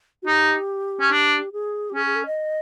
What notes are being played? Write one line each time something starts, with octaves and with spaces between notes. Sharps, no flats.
F#4
D#4 G4
C#4
D4
G#4
G4
C#4 G#4
G#4
A4
D#5